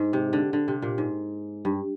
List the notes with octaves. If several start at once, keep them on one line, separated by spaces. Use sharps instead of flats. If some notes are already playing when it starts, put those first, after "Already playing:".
Already playing: G#2
C3
D3
D3
C3
A#2
G#2
G2